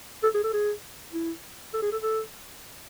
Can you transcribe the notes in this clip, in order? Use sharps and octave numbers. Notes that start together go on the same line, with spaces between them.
A4
G#4
A4
G#4
E4
A4
G#4
A4
A4